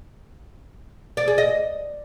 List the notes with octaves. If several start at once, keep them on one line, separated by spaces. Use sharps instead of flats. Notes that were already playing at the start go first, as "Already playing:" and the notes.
D5
G#4
D#5